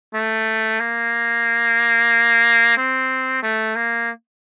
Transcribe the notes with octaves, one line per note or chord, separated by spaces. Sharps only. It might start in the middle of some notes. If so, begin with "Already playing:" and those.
A3
A#3
C4
A3
A#3